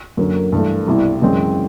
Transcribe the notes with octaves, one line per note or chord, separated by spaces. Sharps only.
F#2 D3 F#3 A#3
G2 E3 A3
C2 B2 G3 C4 E4
F#2 C#3 E3 G#3 C4